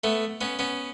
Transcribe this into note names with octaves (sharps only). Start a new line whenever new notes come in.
A3 B3
B3 C#4
B3 C#4